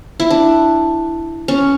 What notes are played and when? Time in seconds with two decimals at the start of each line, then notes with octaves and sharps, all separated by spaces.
0.20 E4
0.30 D4
1.48 C#4